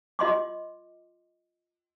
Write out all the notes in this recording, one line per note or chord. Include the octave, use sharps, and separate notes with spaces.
F4 D#5 C6 D6